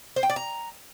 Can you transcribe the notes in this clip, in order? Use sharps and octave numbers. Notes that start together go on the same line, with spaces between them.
C5
G5
D5
A#5